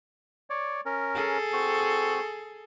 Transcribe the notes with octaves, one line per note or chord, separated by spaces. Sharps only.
C#5 D5
C#4 A#4
G#4 A4
C4 F#4